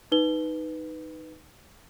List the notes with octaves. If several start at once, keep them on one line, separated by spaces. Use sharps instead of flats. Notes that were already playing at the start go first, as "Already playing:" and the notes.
D#4 B4 G7